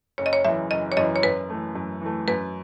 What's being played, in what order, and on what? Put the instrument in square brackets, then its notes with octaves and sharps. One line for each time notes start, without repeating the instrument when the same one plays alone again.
[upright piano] F#1 [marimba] C#5
[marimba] D#5
C#5
[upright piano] F#2 E3 [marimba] E5
[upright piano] F#1 [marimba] D#5
[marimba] C#5
[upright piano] F#2 E3 [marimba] D#5
[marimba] C#5
[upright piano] F#2 [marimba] B4
[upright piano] E3 A3
F#2
E3 A3
[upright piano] F#2 [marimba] B4